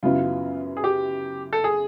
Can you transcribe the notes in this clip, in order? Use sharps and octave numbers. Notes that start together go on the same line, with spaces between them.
F#2 C#3 F#3 B3 E4 F4
G#4
G4
A4
G#4